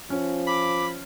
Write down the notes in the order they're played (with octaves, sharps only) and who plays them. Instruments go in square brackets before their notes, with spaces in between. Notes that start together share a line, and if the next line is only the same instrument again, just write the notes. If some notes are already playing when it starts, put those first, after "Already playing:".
[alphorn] F3 [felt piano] C#4
[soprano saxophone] B5 [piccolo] D6